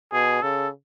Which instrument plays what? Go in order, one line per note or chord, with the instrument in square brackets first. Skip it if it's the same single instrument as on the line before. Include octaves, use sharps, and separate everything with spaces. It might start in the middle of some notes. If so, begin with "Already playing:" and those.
[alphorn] B2 [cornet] G#4
[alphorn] C#3 [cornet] A4